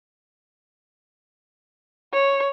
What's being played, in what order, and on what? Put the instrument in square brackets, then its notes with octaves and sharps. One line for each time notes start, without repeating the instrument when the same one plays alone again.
[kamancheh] C#5